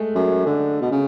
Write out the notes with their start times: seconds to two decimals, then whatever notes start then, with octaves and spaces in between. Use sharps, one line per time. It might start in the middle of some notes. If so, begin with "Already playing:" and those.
Already playing: G#3 A3
0.15 F#2
0.46 D3
0.81 B2
0.91 C#3